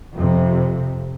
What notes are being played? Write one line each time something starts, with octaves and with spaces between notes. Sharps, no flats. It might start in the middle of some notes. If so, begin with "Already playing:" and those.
F2 C3